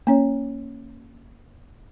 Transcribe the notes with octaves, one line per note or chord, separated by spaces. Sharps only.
A#3 C#4 C#5